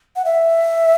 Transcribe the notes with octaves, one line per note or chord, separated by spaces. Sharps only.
F#5
E5